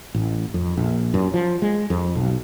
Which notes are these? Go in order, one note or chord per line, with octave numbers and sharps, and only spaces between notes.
A1
F2
A#1
F#2
F3
G#3
F2
B1